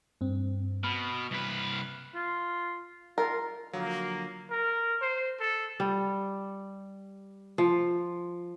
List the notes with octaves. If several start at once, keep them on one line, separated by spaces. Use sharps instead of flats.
G2 C4
B2 B5 F6
C2 B4
F4
F4 A#4
D3 F3 F#3 A#3 F4 F5
A#4
C5
A4
G3
F3